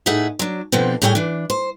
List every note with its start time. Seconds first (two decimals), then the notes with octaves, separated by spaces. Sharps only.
0.06 A2 D#4 G#4 E5 F#5
0.39 F#3 D4
0.72 B2 D3 F3 B3 C4
1.02 A2 G3 G#4 C#5 D5 G5
1.15 E3 D4
1.50 C5